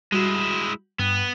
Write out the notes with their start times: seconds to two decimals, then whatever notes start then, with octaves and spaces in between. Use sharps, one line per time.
0.12 G3 G#3 E4 F#4
0.99 G2 B3